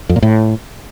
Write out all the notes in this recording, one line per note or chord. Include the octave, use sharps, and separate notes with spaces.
F2
A#2
A2